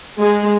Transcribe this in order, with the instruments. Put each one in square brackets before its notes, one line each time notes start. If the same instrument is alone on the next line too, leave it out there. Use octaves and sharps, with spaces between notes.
[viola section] G#3